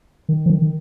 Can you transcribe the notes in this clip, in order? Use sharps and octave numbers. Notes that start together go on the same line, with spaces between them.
D#3
F3
D#3
D#3